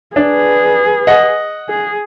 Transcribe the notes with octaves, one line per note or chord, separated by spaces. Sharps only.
D4 G#4 B4
D#5 F#5
G#4